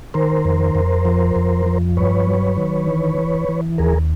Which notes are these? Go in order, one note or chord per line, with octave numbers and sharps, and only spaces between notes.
D#3 A#4 C5
F2
F2
F3
F2
F3
G2 B4 C#5
F#3
D#3
E3
E3
E3
D#2 G#4 A#4